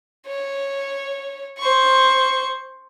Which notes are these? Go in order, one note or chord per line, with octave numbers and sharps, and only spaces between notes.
C#5
C5 C#6